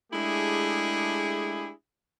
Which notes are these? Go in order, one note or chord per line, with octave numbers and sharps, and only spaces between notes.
G#3 A3 D4 E4 G4 G#4